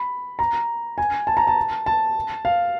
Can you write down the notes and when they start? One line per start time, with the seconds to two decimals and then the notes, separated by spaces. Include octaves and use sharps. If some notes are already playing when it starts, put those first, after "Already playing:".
Already playing: B5
0.39 A#5
0.98 G#5
1.27 A5
1.37 A#5
1.47 A5
1.86 A5
2.45 F5